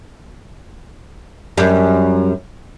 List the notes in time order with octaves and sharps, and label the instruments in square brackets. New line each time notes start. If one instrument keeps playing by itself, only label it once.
[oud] F#2 G3